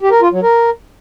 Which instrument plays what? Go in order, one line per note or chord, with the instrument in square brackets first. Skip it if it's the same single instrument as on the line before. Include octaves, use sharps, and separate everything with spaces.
[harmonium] G4
A#4
F4
F#3
A#4